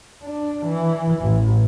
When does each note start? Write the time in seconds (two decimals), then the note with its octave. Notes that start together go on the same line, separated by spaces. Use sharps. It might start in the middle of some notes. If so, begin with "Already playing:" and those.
0.24 D4
0.66 E3
1.22 A1 A2